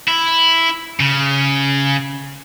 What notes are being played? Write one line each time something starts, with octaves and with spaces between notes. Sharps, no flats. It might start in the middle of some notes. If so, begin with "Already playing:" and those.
E4
C#3